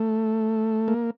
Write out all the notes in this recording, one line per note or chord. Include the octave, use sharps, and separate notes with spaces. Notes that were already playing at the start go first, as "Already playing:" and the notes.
Already playing: A3
A#3